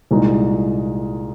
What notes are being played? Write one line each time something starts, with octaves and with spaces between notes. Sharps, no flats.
C2 A#2 G#3 D#4 G#4